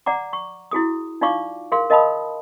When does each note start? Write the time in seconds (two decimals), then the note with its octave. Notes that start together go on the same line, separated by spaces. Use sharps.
0.06 D5 F#5 A#5 D6
0.33 C#6
0.71 E4 F#4 G#4 D#6
1.21 D#4 F4 D5 F5 C#6 D6
1.72 G#4 A#4 F5 C6
1.90 A#4 D#5 F5 A5 B5 D#6